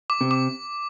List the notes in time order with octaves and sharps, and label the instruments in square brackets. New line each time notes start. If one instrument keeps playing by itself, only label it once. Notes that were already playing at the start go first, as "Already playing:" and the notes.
[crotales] D6
[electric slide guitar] C3
[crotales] D6